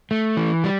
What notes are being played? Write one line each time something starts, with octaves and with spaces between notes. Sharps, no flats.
A3
E3
G3